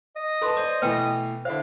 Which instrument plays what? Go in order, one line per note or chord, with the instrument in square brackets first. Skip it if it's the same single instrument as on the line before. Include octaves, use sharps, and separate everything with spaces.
[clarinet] D#5
[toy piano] A4 C6 [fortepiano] B4 A5
[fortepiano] C5 D5 [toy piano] D6
[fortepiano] B2 E3 A3 [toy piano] B4 G5
[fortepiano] D3 E4 F5 [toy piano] C5